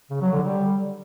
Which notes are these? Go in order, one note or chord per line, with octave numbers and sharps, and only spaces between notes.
C#3
F#3
D3
G3